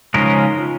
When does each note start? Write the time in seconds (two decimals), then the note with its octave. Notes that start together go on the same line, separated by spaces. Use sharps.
0.14 C#3 F3 G#3 C#4 D#4 A#4
0.58 F4